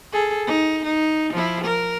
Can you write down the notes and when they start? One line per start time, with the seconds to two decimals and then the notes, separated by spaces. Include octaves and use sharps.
0.12 G#4 A4
0.47 D#4
0.84 D#4
1.33 F3 E4
1.64 A#4